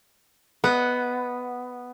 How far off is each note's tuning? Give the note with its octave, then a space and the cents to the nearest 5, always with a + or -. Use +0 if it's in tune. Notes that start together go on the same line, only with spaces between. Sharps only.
B3 +0 D#5 +25 F#5 +0